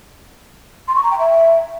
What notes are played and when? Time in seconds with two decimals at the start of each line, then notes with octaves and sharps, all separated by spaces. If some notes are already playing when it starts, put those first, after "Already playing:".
0.88 C6
0.96 C#6
1.03 A#5
1.11 G5
1.19 E5